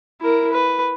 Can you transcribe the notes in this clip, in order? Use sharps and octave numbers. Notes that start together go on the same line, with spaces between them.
E4 A#4
B4